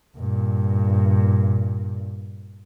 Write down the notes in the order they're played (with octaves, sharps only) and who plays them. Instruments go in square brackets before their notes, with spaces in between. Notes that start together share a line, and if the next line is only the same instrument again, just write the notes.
[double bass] G2 A#2